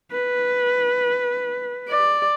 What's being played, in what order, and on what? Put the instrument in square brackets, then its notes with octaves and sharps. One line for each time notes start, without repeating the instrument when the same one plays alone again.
[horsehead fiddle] B4
[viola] D5